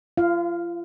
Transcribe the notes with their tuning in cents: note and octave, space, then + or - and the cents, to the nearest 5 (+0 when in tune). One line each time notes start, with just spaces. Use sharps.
F4 -35 F5 +0